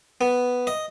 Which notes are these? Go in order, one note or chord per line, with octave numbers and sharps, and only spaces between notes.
B3
D#5